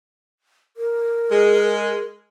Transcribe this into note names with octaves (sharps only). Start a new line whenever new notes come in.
A#4
G#3